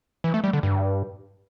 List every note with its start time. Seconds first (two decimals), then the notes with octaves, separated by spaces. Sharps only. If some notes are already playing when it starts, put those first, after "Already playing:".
0.24 E3
0.34 A3
0.44 G3
0.53 D3
0.63 G2